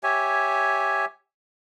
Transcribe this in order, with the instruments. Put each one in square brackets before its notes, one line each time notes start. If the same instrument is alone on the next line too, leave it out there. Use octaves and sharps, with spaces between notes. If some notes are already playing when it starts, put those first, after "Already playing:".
[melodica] G4 C#5 E5 G#5